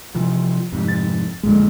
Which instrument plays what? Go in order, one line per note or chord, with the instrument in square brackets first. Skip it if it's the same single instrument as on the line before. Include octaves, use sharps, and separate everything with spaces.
[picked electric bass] C3 E3 F3
F2 G#2 C3
[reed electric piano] A6
[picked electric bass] A1 A#2 D3 [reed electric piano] F2 G#3